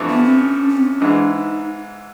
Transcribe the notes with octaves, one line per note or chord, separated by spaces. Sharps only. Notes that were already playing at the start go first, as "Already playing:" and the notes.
Already playing: F2 C3 E3 A3 D4
B3
C4
C#4
C#4
C4
C#4
G#2 E3 G#3 D4
D#4